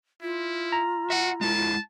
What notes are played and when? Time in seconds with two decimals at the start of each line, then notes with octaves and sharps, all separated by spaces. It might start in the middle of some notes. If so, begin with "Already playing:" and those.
0.22 E4 F4
0.72 A#5
1.10 F#4 E5 F#5
1.41 G#3 E4 A5